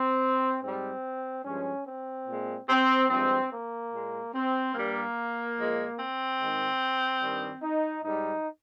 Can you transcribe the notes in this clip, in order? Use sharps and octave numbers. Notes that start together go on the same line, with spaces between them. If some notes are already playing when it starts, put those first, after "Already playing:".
Already playing: C4
G#2 G3 C4
G2 F3 G#3 C#4
C4
A#2 G#3
C4
G2 F3 G#3 C4
A#3
A#2 G#3
C4
G2 G3 A#3
A#2 F3 G#3
C4
G#2 D#3 G#3
G2 D#3 G3
D#4
G#2 G3 D#4